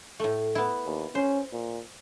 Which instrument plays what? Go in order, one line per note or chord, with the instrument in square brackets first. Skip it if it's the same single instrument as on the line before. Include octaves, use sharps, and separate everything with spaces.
[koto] A2 A3
B3 E4
[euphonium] D#2
[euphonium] C#4 [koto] C5
[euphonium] A#2